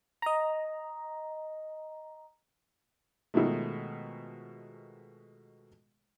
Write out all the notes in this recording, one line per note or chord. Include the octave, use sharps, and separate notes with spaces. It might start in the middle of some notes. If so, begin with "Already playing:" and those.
D#5 A#5
B2 D#3 F3 G#3 A3